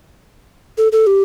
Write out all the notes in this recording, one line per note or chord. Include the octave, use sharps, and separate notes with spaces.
A4
A4
G4